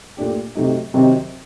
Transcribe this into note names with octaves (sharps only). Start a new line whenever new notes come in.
A#2 A3 D4 G4
C3 F#3 A3 D#4
C3 D#3 F#3 C4 D#4